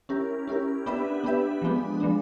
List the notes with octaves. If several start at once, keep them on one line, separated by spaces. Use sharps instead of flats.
C#4 E4 G4 A#4
C#4 E4 G4 A#4
B3 D4 G4 B4 E5
B3 D4 G4 B4 E5
F3 G#3 B3 D4
F3 G#3 B3 D4